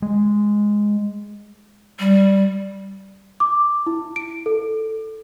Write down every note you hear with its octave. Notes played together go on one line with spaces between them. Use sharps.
G#3
G3
D6
E4
D7
A4